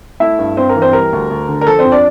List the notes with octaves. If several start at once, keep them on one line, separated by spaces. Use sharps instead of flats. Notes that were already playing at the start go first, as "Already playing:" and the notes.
A3 E4 E5
G2
G2 C4 C5
A#4
E3
C4 C5
G3 A#4
D2
D2
D3
A#4
F3 A4
C4 C5
F2
D4 D5